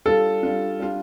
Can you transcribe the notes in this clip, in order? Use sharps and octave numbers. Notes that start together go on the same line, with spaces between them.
G3 D4 F4 A4
G3 D4 F4
G3 D4 F4